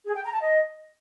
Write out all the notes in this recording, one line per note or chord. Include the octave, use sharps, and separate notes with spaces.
G#4
G5
A#5
A5
D#5